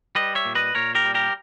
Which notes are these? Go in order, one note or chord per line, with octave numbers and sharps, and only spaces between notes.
G3 B4 D#5
C#5 E5
A#2
B4 D#5
A#2 A#4 C#5
G4 A#4
G3
G4 A#4